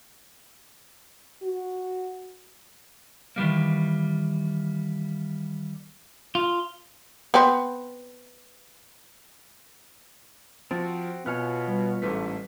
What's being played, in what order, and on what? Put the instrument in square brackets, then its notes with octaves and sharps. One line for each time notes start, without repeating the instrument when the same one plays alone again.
[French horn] F#4
[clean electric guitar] D#3 E3 G3 A#3
F4
[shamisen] B3 C4
[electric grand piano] F3 [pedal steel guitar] C4 F#4 [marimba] A6
[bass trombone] B2 [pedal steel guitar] B3 F4 C#5 [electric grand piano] G#5 F6 F#6
[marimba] G3 B4
[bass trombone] A1 [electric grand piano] G#2 A3 B6 [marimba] B4